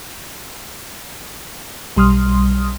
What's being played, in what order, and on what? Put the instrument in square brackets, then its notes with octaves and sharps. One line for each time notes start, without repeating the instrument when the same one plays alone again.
[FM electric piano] B1 G3 C6 D#6 F6